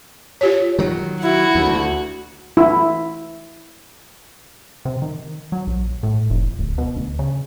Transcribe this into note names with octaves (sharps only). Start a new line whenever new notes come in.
F4 G4 C#5
D#3 F#3
E4 F#4
D2
E4
C3
D#3
F#3
A#1
A2
F1
D1
B2
D2
C#3